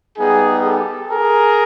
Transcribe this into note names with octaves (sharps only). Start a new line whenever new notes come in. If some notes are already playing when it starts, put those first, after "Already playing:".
G3 B3 D#4 G#4
G4 A4
G#4 A#4